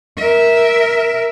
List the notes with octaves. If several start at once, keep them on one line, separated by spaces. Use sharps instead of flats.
A#4 E5